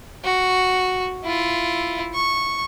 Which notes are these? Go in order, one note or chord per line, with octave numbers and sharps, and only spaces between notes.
F#4
E4 F4
C#6